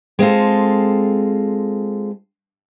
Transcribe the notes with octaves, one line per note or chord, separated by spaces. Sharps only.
G#3 C4 F4 A4